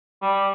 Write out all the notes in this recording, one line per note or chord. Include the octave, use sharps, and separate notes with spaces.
G3